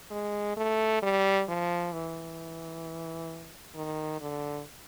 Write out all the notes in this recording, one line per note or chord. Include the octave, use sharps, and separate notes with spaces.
G#3
A3
G3
F3
E3
D#3
D3